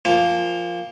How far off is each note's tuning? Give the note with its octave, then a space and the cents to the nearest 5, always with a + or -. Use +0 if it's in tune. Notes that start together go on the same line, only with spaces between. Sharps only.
F3 +0 A#3 +0 G#5 -45